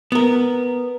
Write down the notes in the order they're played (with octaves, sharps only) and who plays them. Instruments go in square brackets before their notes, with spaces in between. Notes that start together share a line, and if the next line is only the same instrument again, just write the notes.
[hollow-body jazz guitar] B3 A#4